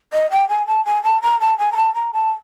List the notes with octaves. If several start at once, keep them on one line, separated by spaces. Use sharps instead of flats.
D#5
G5
G#5
A5
G#5
A5
A#5
A5
G#5
A#5
A5
A#5
A5